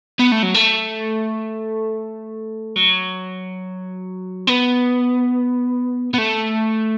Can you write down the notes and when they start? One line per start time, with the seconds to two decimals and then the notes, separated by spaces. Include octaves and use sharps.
0.19 B3
0.32 A3
0.43 F#3
0.54 A3
2.76 F#3
4.47 B3
6.14 B3
6.18 A3